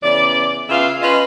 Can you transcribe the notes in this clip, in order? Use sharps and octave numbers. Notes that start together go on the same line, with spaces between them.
E2 C#3 D5
C#3 B3 F4 E5 F5
C#4 F4 B4 D#5